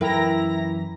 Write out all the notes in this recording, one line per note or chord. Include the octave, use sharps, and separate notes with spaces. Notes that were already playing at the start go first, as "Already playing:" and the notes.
F#2 E3 E4 A#4 B4 G5 A#5 A#6